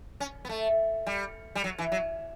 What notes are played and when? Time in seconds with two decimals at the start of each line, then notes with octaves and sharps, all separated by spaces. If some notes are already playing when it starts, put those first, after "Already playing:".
0.20 C#4
0.45 B3
0.49 A3
1.07 G3
1.55 G3
1.64 F#3
1.79 E3
1.92 F#3